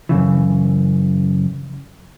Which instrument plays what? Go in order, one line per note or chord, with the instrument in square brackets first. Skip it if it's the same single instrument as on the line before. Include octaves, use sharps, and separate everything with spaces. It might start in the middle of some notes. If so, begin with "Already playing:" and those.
[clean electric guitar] F#2 A#2 C#3 E3